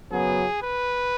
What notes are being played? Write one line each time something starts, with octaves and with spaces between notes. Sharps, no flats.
F#2 C#3 F#3 B3 G#4
B4